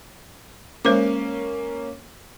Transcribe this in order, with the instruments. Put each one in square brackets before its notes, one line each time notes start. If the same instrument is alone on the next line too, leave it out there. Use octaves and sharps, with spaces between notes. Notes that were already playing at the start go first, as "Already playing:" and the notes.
[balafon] G#3 C5 D6 [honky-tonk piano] A#3 C#4